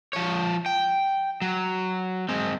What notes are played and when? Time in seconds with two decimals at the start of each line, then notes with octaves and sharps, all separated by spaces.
0.13 F3 C#5
0.66 G5
1.42 F#3
2.29 G#3 C4